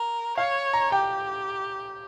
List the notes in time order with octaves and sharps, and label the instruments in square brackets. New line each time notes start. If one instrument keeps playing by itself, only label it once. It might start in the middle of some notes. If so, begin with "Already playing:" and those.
Already playing: [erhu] A#4
[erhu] C#5 [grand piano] F5
[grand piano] A#5
[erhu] G4 [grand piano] G5